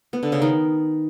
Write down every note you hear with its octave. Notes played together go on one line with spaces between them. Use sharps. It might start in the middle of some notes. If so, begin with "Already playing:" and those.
B3
D3
C#3
D#3